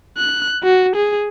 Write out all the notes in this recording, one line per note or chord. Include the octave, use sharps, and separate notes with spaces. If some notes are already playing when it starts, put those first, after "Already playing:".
F#6
F#4
G#4